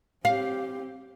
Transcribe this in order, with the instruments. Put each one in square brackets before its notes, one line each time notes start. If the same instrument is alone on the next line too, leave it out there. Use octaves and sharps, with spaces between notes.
[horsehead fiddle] C4 G4 [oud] F5